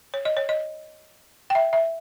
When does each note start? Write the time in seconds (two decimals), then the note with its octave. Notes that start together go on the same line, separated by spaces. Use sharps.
0.14 C#5
0.25 D#5
0.37 C#5
0.49 D#5
1.50 G5
1.55 E5
1.73 E5